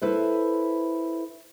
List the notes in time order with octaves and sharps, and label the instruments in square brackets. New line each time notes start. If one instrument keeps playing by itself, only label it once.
[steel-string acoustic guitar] E4 A4 B4 C5